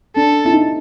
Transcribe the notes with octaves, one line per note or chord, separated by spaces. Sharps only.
D4 A4
E4
D#4